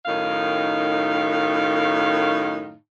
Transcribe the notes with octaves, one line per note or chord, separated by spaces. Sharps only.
F#2 A2 D#3 D#4 F5